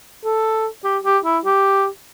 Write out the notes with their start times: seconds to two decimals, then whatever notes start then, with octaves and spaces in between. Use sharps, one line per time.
0.25 A4
0.84 G4
1.04 G4
1.25 E4
1.45 G4